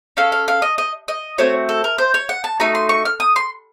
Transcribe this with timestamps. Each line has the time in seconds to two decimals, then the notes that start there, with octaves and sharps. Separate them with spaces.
0.17 C#4 A4 F5
0.32 F5
0.48 F5
0.62 D#5
0.78 D#5
1.08 D#5
1.38 A3 C4 F#4 C#5
1.69 A4
1.84 A#4
1.98 C5
2.14 C#5
2.29 F#5
2.44 A5
2.60 A3 D#4 F#4 A#5
2.75 C6
2.89 C#6
3.05 F6
3.20 D#6
3.36 C6